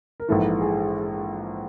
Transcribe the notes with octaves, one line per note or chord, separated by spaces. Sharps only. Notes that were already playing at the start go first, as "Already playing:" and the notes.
A#4
A#1 G#2 E3 A4
G#4